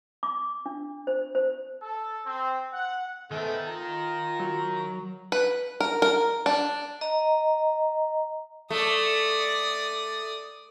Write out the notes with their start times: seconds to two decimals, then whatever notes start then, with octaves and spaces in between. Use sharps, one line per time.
0.23 D6
0.66 D4
1.07 C5
1.35 C5
1.82 A4
2.26 C4
2.73 F#5
3.31 G#2 D#3 G#3 A3 B3
3.67 F4 A#5
4.40 F#3
5.32 B4
5.80 A#4
6.02 A#4
6.46 D4
7.01 D#5 A#5
8.70 A3 D5 D#6